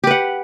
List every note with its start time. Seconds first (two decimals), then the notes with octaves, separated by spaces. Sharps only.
0.04 G4
0.07 B4
0.11 F#5